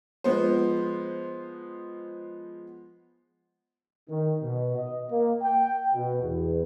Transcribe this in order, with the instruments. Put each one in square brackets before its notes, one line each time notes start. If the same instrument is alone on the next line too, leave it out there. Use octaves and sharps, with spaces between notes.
[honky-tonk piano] F3 G#3 B3 C5
[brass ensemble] D#3
B2
D#5
A#3
G5
B2
E2